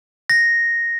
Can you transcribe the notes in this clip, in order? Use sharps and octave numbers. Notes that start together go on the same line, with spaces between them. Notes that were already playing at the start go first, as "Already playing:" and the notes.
A#6